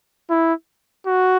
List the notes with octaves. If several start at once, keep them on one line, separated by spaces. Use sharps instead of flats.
E4
F#4